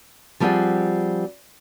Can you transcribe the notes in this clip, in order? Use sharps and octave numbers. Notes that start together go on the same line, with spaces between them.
F3 G3 C4 F4 G#4 F#5